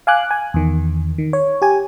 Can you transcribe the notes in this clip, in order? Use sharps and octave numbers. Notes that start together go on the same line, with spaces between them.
F5 G#5 D6 F#6
G#5
E2 D#3
D#3
C#5
G4 G#5